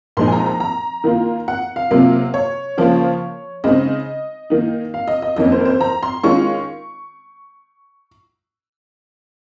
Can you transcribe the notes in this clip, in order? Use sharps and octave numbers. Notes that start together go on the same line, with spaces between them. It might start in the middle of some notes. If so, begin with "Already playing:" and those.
A#2 F3 G#3 D#4 C6
G#5
A#5
A#5
A#5
D#3 A#3 F4
F#5
F5
C3 F#3 A#3 F4
C#5
C#3 F3 A#3 F4
C#3 G#3 C4 D#4 D#5
D#3 A#3 D#4
F5
D#5
D#5
F2 D#3 A#3 C#4 D#5
C5
A#4
C5
A#5
C6
D#3 G#3 C#4 F4 C#6